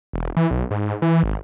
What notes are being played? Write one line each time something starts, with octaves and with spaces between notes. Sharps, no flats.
E1
E3
B1
G#2
E3
G#1